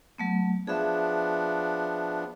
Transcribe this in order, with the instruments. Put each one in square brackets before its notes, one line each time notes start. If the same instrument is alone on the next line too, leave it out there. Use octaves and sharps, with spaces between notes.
[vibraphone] F#3 A3 B3
[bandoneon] F3 B3 D4 [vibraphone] G#4 E5